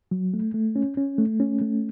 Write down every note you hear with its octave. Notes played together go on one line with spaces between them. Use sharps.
F#3
A3
A3
C#4
C#4
A3
C#4
A3